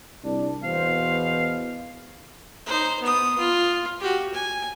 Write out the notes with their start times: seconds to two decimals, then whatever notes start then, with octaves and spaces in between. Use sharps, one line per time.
0.24 C2 D4
0.63 E2 B2 C5 F5
2.66 D#4 C5
3.01 B3 D#6
3.38 F4
4.00 F#4 G4
4.34 G#5